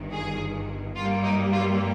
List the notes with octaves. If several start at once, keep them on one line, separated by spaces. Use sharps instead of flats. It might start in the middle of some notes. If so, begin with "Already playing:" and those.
Already playing: G1 G2 D#3
G#4
G2 G3 A#3 F4
D#4
F4